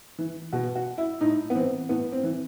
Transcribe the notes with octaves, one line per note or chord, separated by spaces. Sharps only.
E3
B2 F#4
F#4
E4
A2 D#4
B3
E3 C4
A2 B3
C4
E3